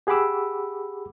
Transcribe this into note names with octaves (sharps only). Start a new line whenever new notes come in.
G4 G#4 F#5 B5 D6 E6